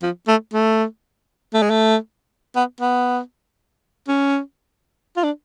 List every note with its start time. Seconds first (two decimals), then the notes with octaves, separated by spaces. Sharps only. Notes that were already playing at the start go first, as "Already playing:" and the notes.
0.03 F3
0.28 A3
0.54 A3
1.54 A3
1.62 G#3
1.70 A3
2.56 B3
2.81 B3
4.08 C#4
5.17 F4
5.24 D4